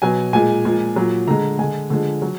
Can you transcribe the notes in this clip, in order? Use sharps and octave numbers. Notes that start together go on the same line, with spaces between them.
B2 F#3 G#5
A#2 G#3 G#5
A#2 F3 G#3
A#2 F#3
D3 G#3 A#5
D3 G#3 G#5
D3 F3 G#3
F#3